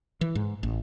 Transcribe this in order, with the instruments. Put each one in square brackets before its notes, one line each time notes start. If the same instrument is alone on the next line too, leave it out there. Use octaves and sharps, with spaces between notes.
[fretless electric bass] E3
G#2
A1